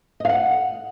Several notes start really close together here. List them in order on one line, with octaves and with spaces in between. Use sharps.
D#5 F5 F#5